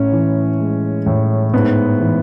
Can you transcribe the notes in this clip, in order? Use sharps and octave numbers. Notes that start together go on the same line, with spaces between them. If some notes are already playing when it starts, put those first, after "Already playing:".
Already playing: A2 C#4
E3
G#3
A2
G#2 B3
E3